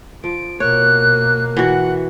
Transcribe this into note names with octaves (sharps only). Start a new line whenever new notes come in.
F3 D7
B2 A#3 C#5 F#6
E3 F#4 F#5